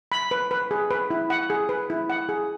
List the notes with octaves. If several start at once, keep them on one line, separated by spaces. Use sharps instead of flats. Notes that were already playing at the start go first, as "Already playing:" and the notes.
B5
B4
B4
G#4
B4
E4
F#5
G#4
B4
E4
F#5
G#4